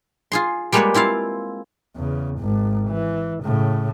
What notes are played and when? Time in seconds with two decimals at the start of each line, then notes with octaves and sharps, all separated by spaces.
0.32 F4 G#4 C6
0.72 G3 G#3 A#3 G4 B4 C#5
0.94 C4 E4 F4 F5
1.96 E2 C#3
2.40 G#1 G#2
2.89 E3
3.44 A2 C#3